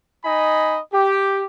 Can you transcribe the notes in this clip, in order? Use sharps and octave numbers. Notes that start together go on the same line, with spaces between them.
D#4 D#5 G#5 B5
G4